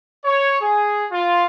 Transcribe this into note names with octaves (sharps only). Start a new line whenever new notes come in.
C#5
G#4
F4